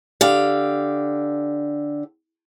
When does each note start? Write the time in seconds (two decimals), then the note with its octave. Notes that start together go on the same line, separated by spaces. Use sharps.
0.21 D3 G4 F5